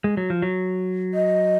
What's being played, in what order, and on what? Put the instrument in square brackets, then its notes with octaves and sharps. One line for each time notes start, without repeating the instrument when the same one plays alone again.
[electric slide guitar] G#3
F#3
F3
F#3
[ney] D#5